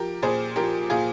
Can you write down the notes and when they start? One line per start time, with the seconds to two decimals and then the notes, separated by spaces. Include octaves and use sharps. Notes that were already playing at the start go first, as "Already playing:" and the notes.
Already playing: F3 G4 A#4
0.22 A#2 G#4 C5
0.56 F3 G4 A#4
0.90 A#2 F4 G#4